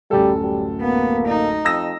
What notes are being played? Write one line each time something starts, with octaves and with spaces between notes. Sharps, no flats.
D1 F#2 G3 A4
G3
A#3 B3
D#4
F2 D#6 E6 A#6